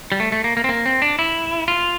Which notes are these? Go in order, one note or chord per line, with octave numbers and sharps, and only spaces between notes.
G3
A3
A3
A#3
A#3
C4
A#3
C4
D4
E4
F4